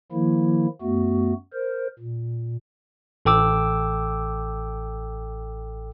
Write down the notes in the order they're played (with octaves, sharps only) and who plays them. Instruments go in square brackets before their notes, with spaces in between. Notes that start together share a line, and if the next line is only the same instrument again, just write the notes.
[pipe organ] D#3 F3 A#3 E4
F#2 A3 B3 F#4
A#4 C5
A#2
[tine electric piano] A1 A4 G5 D6 E6